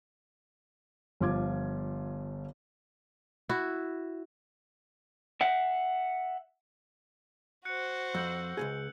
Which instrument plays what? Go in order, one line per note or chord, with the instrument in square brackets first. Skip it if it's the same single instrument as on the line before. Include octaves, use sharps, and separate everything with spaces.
[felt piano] G1 F3 F4 D6 G#6
[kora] E4 F#4
[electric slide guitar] E5 F#5
[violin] F#4 C5 [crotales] F#6 C#7
[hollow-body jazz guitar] F2 [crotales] E6 G6 F#7
[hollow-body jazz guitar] C#2 G#2 G#4